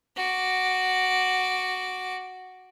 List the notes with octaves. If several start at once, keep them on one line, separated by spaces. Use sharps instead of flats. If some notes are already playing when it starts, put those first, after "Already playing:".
F#4 D6